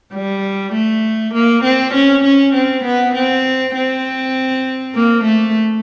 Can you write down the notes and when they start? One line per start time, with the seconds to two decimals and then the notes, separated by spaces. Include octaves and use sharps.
0.13 G3
0.73 A3
1.34 A#3
1.64 C4
1.94 C#4
2.24 C#4
2.54 C4
2.84 B3
3.14 C4
3.74 C4
4.95 A#3
5.24 A3